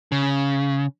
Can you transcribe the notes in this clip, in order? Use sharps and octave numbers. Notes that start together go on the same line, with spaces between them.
C#3